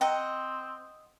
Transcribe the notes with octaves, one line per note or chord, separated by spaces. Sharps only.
C4 D#5 F#5 G5 A#5